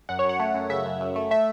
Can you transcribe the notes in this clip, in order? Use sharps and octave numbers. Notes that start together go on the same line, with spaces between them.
F#2 F#5
C#5
F#2
F#5
A3
F#2
C#3 E5
F#2
F#2
A3
A3 E5